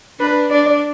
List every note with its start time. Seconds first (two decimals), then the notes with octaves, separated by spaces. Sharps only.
0.19 D4 B4
0.51 D4 D5